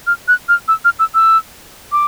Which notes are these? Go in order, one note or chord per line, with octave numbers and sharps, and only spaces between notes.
F6
F#6
F6
E6
F6
E6
E6
D6